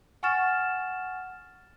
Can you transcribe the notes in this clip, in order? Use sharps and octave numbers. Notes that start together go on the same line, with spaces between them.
F#5 G#5 C#6 F6 A6 E7